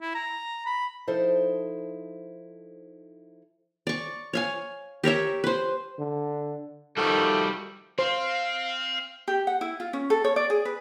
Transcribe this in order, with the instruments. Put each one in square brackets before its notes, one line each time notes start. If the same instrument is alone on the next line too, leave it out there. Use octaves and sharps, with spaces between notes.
[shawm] E4
A#5
B5
[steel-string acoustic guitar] F3 D#4 E4 A4 C5
[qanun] D5 C#6
C#5 F5 G#5
G4 A#4 C#5 E5
B4 C5
[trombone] D3
[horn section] D#3 F3 A3 [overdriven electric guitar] G3 F#4 [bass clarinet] A4
[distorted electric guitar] C4 [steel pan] C5 [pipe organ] F5
[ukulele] G4
F#5
E4
F4
C#4
A4
C#5
D5
G#4
B4